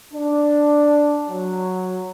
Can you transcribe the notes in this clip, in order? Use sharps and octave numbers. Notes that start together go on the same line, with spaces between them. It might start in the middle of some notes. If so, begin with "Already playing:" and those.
D4
F#3